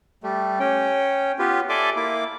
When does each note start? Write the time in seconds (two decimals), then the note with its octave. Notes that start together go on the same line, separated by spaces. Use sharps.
0.23 G3 A3
0.60 C#4 G5
1.39 B3 F4 G4 B4
1.69 A4 D5 E5 G#5 C6 D6
1.96 A#3 E4 D6